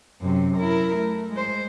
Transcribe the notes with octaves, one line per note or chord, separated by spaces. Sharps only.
F#2 C3
E4 A#4
A3
G#3 C5